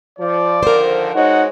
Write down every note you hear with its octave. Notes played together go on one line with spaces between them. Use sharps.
F3 D5
D3 D#3 F3 A#4 C5
G#3 D#4 F#4 C#5 F#5